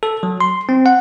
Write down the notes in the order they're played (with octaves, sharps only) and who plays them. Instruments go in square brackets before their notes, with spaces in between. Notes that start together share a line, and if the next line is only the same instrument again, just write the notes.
[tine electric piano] A4
F#3
C6
C4
F#5